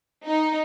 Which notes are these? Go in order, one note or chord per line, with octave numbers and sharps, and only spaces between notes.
D#4